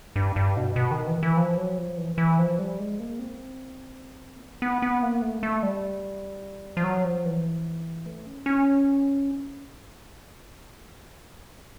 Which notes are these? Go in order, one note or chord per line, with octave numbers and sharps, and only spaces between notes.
G2
G2
B2
B2
D#3
E3
E3
F3
F#3
F3
E3
E3
F3
G3
G#3
A#3
C4
A#3
B3
B3
B3
A#3
A3
A3
G3
F3
F#3
F3
E3
A3
C#4
C#4